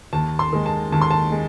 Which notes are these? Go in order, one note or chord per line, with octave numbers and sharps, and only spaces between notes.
D#2 A5
C6
D#3 G#3
A5
D#2 A5
C6
A5
G#3